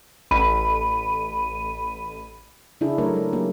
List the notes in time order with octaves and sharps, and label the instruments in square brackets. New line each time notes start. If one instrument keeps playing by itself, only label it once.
[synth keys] A1 B5 D#7
[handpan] C#3 D4 E4 G#4
D3 F#3 A3 A#4 C#5
G#3
F#3 A#3 C#4 G4